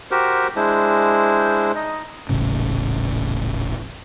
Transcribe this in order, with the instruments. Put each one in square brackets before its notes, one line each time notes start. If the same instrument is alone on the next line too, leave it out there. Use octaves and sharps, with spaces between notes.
[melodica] F#4 G4 A#4 C5
G#3 D4 E4 C5
D#4 D#5
[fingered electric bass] D#1 A1 A2 C#3